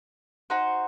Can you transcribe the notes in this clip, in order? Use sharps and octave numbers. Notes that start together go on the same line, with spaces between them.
D#4 F#4 C5 F#5